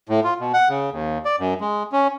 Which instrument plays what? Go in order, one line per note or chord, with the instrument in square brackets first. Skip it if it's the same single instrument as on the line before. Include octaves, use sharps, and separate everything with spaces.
[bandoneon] A2
F4
B2
F#5
C#3
D#2
D5
F#2
G#3
C#4